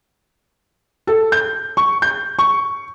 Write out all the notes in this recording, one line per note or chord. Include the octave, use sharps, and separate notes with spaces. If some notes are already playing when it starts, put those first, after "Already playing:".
A4
G6
C#6
G6
C#6